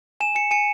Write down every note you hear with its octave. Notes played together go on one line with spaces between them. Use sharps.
G#5 E7
G#5 C#7
G#5 C#7